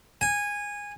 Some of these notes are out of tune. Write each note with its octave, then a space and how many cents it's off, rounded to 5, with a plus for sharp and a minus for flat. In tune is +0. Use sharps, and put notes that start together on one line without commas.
G#5 -15